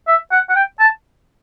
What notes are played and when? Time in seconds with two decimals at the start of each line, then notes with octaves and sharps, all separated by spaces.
0.08 E5
0.32 F#5
0.50 F#5
0.56 G5
0.80 A5